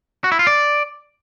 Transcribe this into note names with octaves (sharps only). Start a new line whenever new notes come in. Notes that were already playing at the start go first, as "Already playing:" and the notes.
F#4
E4
F4
D5